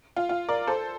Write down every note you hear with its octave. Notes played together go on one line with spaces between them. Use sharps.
F4
F4
A#4 D5
A4 C5